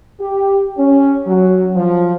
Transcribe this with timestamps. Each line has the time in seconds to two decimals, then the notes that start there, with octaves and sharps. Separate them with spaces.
0.21 G4
0.77 C#4
1.27 F#3
1.76 F3